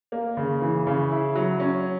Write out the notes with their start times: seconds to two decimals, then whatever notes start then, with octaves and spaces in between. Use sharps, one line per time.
0.12 A#3
0.37 C#3
0.62 E3
0.87 C#3
1.11 E4
1.35 F#3
1.60 C#4